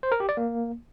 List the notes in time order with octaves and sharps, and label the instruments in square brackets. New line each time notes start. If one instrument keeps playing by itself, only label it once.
[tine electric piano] C5
A#4
G4
D5
A#3